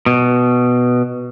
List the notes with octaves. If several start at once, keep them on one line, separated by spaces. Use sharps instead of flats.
B2